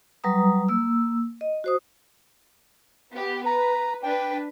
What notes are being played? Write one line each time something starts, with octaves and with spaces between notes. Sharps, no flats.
F#3 G3 B4 A#5 D#6
A#3 E6
D#5
F#4 C5 D#6
B3 G4
B4 A#5
D4 B4 G5